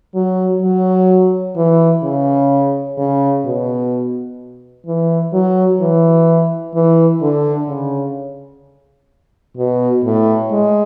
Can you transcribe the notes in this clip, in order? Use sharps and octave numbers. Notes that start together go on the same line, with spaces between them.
F#3
F#3
E3
C#3
C#3
B2
E3
F#3
E3
E3
D3
C#3
B2
A2
G#3